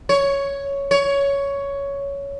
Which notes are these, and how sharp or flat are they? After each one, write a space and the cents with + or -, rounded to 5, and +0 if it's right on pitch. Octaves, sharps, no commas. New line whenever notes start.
C#5 +5
C#5 +10